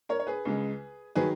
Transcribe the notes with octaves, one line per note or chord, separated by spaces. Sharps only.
A#4 C#5
C#5
G#4 B4
C#2 C#3 G#3
D#3 F#3 G#4 B4